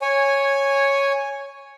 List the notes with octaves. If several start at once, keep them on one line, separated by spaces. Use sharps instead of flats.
C#5 G#5